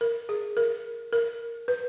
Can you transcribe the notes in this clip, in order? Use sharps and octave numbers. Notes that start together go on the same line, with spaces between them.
A#4
G#4
A#4
A#4
B4